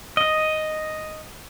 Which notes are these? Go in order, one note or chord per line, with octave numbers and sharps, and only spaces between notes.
D#5